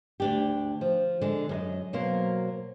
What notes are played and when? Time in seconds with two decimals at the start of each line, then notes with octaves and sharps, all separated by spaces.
0.20 D2 D4 G4
0.81 F3
1.21 D3 G#3
1.49 F#2 A#4 D#5
1.93 B2 F#3 A#3 C5 F5